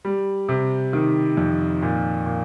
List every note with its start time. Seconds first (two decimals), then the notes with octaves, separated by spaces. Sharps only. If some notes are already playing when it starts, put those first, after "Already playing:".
0.05 G3
0.49 C3
0.93 D#3
1.37 F2
1.82 A#2
2.26 A#2